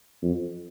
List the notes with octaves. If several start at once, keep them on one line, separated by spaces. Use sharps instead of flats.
F2